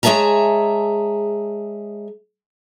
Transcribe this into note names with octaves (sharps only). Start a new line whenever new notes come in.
G#3 G#4 C#5 E5 A5 A#5